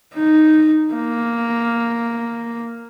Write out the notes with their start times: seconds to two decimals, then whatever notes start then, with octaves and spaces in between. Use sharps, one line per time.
0.15 D#4
0.94 A#3